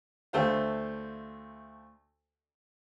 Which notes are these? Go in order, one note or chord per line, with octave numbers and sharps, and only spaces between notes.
D2 A3 C5 F5